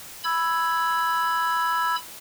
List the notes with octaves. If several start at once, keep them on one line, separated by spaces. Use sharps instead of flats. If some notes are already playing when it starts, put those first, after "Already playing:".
B5 E6 G#6